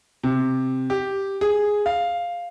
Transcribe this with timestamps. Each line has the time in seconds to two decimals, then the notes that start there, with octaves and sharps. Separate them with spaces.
0.23 C3
0.90 G4
1.41 G#4
1.86 F5